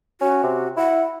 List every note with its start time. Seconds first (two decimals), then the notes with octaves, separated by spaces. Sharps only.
0.21 C#4 F#4
0.43 C3
0.77 E4 F#5